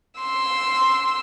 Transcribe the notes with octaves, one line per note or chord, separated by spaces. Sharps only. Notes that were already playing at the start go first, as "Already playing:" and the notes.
C6 E6